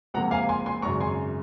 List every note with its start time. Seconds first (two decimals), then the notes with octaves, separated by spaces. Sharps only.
0.14 C#2 C3 F3 A#3 F#5 A#5
0.31 F5 G#5
0.49 G#5 C6
0.66 G#5 C6
0.82 G#1 F#2 C#3 A#5 C#6
1.00 G#5 C6